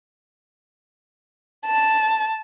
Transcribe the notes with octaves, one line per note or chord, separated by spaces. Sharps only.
A5